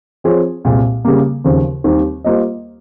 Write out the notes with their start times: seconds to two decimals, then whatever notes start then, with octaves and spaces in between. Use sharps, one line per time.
0.24 F3 C4 F4 G#4 C#5
0.65 C2 A#2 G#3
1.05 C#3 G3 A#3
1.44 D#2 C#3 F3
1.84 D#2 D#3 G3 C4 G4
2.24 G3 A#3 F4 C5 D#5